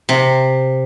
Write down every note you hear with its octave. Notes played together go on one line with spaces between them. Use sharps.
C3